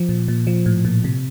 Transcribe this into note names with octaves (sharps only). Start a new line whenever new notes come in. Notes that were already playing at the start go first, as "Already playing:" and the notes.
Already playing: F3
A#2
A#2
F3
A2
A#2
C3